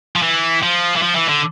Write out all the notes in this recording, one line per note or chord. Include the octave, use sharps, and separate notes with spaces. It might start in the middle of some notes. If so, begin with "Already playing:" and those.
F3
E3
F3
E3
F3
E3
D3